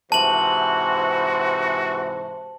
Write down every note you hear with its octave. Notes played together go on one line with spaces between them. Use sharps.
G#2 C3 E3 F#4 C5 A5 F#7